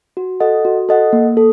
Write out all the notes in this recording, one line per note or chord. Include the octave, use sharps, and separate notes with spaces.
F#4
A4 D#5 F#5
F#4
A4 D#5 F#5
A#3
A4